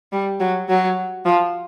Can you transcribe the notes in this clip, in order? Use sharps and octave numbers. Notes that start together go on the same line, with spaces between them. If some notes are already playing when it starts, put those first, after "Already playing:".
G3
F#3
F#3
F3